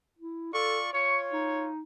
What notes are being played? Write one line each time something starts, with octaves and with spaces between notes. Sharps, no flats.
E4
F4 A4 D5 C#6
F4 C#5 C#6
D#4